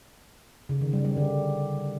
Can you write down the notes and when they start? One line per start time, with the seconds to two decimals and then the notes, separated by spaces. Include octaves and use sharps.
0.69 C#3
0.81 D#3
0.93 G3
1.05 G3
1.17 D3